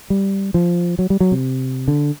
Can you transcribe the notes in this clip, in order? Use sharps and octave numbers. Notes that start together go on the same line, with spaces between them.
G3
F3
F#3
G3
F#3
C3
D3